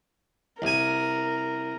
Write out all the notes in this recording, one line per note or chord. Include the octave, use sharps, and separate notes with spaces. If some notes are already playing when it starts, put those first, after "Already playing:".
C2 A#4 G#5